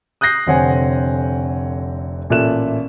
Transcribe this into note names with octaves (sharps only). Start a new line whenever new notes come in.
D#6 F#6 G6 A#6 C7
F1 D3 C4 C#5 F#5 G#5
A1 A#2 A4 E5 F#6 E7